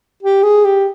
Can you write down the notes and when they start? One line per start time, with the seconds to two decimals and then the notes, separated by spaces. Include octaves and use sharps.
0.23 G4
0.43 G#4
0.65 G4